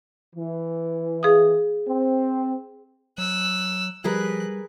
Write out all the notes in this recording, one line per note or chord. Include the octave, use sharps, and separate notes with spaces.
E3
G#4 F5 D#6
C4
F#3 E6 F#6
F3 G3 G#4 A#4 B4 F#6